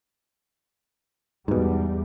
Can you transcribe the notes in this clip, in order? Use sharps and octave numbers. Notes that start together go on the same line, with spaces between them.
E2 G#2 B2 G3